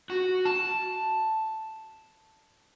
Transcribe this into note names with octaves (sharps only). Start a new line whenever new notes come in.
F#4
A5